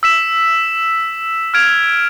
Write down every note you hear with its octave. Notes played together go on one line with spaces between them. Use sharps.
E6 B6 E7
F6 G#6 D7 F7